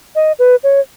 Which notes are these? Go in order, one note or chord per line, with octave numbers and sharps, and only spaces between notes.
D#5
B4
C#5